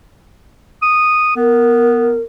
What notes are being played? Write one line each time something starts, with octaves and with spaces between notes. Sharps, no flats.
D#6
B3 A#4